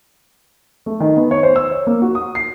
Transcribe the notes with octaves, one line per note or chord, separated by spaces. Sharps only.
A3
D#3
B3
C#5
C5
E6
C#5
A#3
F#4
D#6
C7